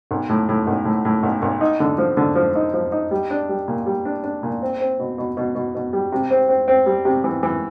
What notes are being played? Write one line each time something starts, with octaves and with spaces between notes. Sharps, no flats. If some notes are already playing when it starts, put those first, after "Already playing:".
B1
A2
A2
B1
A2
A2
B1
B1
D#4
D3
F3
D3
F3
D#4
F3
D#4
G3
D4
G3
A#2
G3
D4
D4
A#2
C4
C4
B2
B2
B2
B2
B2
G3
C3
C4
C4
C4
G3
C3
E3
E3